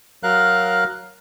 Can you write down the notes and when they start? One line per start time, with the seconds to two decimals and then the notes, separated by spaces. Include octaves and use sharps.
0.23 F#3 A#4 F5 F#6